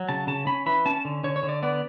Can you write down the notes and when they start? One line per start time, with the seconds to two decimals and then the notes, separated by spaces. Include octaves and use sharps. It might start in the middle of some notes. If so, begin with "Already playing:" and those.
Already playing: F#3
0.09 C#3 A5
0.27 C#3 A5
0.47 C#4 B5
0.66 E3 B5
0.86 C#4 A5
1.05 D3
1.24 D3 C#5
1.36 C#5
1.43 D3
1.49 D5
1.63 B3 D5